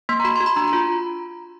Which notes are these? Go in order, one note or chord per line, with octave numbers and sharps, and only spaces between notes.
A#3 C6
A#5
F#4 B5
C6
F#4
B5
D4 A#5
A#5
F4